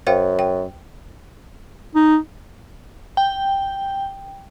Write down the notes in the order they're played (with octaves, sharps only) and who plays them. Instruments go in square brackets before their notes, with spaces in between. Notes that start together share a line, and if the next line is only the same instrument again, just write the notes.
[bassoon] F#2 [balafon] C5 F5 G5
[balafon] G5
[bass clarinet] D#4
[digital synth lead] G5